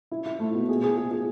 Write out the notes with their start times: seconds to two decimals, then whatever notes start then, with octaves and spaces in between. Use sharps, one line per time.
0.11 E4
0.26 E4
0.40 A3
0.55 B2
0.69 G#4
0.84 G#4
0.97 G#4
1.11 G#4